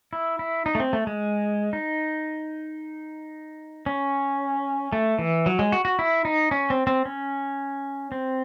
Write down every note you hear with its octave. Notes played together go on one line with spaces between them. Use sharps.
E4
E4
D#4
A3
C4
A3
G#3
D#4
C#4
A3
E3
F#3
G#3
F#4
F#4
E4
D#4
C#4
C4
C4
C#4
C4